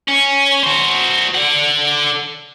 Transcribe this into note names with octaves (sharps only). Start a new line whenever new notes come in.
C#4
F#4 C5
D3 F#5